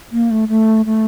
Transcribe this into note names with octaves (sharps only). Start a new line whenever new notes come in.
A#3
A3
A3
A3